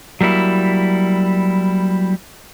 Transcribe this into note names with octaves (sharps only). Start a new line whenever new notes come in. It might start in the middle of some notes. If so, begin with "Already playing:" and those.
F#3 G3 A#3 E4